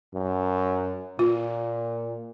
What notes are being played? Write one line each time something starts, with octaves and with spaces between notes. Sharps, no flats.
F#2
A#2 F4